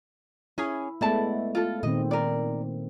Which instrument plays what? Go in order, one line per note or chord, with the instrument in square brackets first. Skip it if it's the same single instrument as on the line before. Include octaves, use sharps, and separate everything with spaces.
[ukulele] C#4 G#4 [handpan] E4
[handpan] G#3 A3 B3 [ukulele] E4 D5 A5
[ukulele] F4 A4
[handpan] A#2 D#3 C4 [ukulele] D#5
[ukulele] A#4 D5